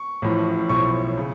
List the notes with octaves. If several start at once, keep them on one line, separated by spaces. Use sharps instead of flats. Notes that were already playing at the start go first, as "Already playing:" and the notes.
Already playing: C#6
A1 A2 F3
B1 A2 F3 C#6
C#3